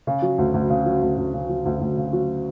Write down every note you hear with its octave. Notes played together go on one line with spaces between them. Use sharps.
C#3
F#3
D2
D2
C#3
F#3
D2
D2
C#3
F#3
D2
D2
C#3
F#3